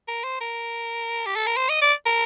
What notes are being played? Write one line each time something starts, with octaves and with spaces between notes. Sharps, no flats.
A#4
C5
A#4
G4
A4
A#4
C5
D#5
D5
A#4